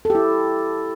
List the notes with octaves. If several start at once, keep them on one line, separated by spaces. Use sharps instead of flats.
E4 G4 A4